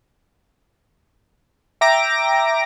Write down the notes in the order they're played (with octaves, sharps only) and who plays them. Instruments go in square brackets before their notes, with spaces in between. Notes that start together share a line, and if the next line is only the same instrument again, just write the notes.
[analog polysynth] E5 G5 A#5 D6 A#6 D7